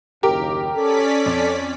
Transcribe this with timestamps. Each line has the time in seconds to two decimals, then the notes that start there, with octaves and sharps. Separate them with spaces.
0.23 F#1 D#2 G4 A#4
0.75 C#4 A4 D5 B6
1.26 F2